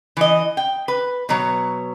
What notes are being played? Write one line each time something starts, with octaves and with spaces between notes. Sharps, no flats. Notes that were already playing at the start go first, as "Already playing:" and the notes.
E3 D#5
G5
B4
B2 F#3 C#5